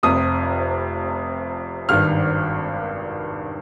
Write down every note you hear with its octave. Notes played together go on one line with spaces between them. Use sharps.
F1 F2 C3 D#6
G#1 G2 D#3 F6